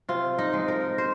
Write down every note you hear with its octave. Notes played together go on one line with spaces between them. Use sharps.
C3 F4
D#4
F3 G#3
A#4
C5